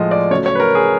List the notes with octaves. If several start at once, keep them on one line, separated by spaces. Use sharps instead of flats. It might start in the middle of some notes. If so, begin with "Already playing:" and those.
Already playing: A2 F3 G#3 D#5
D5
C#3 F#3 A3 C#5
C#5
B4
A#4
G#4